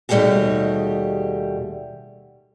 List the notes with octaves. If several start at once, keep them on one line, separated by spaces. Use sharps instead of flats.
D#2 B2 G3 A3 G4 G#4